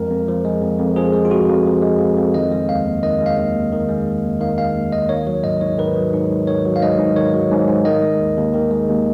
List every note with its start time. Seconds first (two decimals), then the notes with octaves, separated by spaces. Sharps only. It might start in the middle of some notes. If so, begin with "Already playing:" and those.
Already playing: F2 F3 G#3 A#4
0.10 F2
0.28 F3
0.45 G#3
0.62 F2
0.79 F2
0.96 F3 G#4
1.13 G#3
1.25 F4
1.31 F2 F#4
1.49 F2
1.66 F3
1.82 G#3
2.00 F2
2.17 F2
2.34 D#3 D#5
2.52 G#3
2.69 D#2 F5
2.86 D#2
3.03 D#3 D#5
3.21 G#3
3.26 F5
3.37 D#2
3.55 D#2
3.72 D#3
3.89 G#3
4.07 D#2
4.24 D#2
4.40 D#3 F5
4.58 G#3 F5
4.75 D#2
4.92 D#2 D#5
5.09 D#3 C#5
5.27 F#3 C#5
5.44 G#2 D#5
5.61 G#2 C#5
5.78 D#3 B4
5.96 F#3
6.13 G#2
6.30 G#2
6.47 D#3 C#5
6.65 F#3
6.76 F5
6.82 G#2 D#5
6.98 G#2
7.16 D#3 C#5
7.34 F#3
7.51 G#2
7.68 G#2
7.85 D#3 D#5
8.03 G#3
8.19 D#2
8.37 D#2
8.54 D#3
8.71 G#3
8.88 D#2